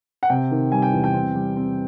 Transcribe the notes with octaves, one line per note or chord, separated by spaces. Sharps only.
F#5
C3 G5
D#3
G3 G#5
G5
E2
G5
C4
G3
C4